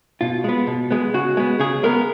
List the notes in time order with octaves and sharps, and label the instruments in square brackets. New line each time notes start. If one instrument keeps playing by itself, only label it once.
[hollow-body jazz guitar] B2 F4
G#3 B3
B2
G#3 B3
C#3 F#4
G#3 B3
C#3 G#4
G#3 B3 A#4